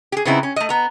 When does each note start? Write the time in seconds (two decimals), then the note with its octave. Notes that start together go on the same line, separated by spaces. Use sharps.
0.12 G4 G#4
0.25 C#3 B3 C4 D#4 E4
0.43 C#4
0.56 A3 D#5
0.69 B3 A#5